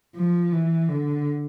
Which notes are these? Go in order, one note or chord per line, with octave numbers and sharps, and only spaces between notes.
F3
E3
D3